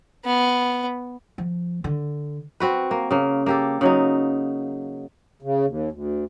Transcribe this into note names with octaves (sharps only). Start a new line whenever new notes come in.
B3
F3
D3
C4 F#4 B4
A#3
C#3 A#3
A#3 G4 A4
C#3 F#3 D#4
C#3
D#2
D2